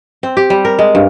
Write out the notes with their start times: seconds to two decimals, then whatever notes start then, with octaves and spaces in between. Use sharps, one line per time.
0.23 C4
0.37 G4
0.50 G3
0.65 A#4
0.79 G#3
0.95 G2